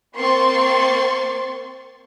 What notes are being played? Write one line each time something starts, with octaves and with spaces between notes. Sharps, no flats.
A#3 C4 C6 C#6 A6